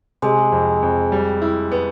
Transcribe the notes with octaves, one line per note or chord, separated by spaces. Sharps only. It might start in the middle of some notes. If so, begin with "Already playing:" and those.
C3 G#3
F2
F2
G3
E4
B3